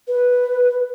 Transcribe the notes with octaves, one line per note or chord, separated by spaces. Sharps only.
B4